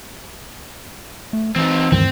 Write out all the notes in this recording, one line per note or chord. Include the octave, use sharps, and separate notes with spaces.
A3
E3 C4 D#4
D2 G2 D#3 E3 C4